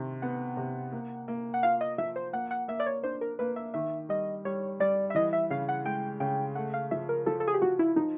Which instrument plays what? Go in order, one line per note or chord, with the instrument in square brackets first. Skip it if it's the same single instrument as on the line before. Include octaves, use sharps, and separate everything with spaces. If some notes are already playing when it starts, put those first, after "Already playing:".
Already playing: [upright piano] C3 D#3
[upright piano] B3 [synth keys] F#5
[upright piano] C3
A#3
A#3
[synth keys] F#5
[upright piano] F4 [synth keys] F5
[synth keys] D#5
[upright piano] F3 [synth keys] E5
[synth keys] C5
[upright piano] A#3 [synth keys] F#5
[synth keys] F#5
[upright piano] A#3 [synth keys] E5
[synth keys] D5
C#5
[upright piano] D4 [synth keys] C5
[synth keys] A#4
[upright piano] A#3 [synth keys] B4
[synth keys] E5
[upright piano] D#3 [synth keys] E5
[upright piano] G3 [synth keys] D#5
[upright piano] G3 [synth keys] C#5
[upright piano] G3 [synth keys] D5
[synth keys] E5
[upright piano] E3 [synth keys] D#5
[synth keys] E5
[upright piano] C#3 [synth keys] F5
[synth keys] F#5
[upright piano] G#3 [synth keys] G5
[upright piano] C#3 [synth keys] G5
[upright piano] A3 [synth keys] F#5
[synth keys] F5
[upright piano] F3 [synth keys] E5
[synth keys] A#4
[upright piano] F3 [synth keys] A4
[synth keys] A4
G#4
G4
[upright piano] F3 [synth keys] F#4
[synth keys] E4
[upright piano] F3 [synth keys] D#4